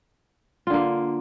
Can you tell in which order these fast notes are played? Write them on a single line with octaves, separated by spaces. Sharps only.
F4 D3 A#3